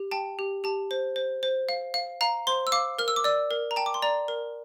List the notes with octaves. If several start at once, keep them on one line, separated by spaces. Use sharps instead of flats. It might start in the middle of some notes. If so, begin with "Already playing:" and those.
Already playing: G4
G5 A5
G4
G4 A5
C5
C5
C5
F5
F5
F5 A#5
C5 C6
E6
F5 D6
A#4 F6
E6
D6
D5 E6
A#4
A#5
G5 A5
D6
C6
D5 A#5
A#4